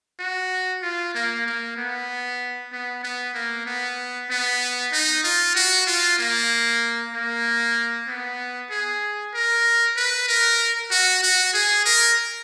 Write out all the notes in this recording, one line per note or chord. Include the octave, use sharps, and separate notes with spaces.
F#4
F4
A#3
A#3
B3
B3
B3
A#3
B3
B3
D#4
F4
F#4
F4
A#3
A#3
B3
G#4
A#4
B4
A#4
F#4
F#4
G#4
A#4